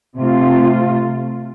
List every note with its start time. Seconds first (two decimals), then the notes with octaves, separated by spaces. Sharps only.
0.17 C3 A3 F4